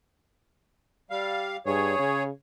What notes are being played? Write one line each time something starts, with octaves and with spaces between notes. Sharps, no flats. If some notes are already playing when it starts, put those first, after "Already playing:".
G3 F5
G2 G#4 C#5
C#3